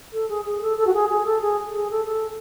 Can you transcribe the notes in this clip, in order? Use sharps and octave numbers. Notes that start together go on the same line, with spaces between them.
A4
G#4
G#4
A4
A4
F#4
G#4
G#4
A4
G#4
G#4
A4
A4